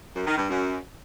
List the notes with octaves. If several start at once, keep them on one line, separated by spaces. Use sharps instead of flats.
F#2
D#3
G2
F#2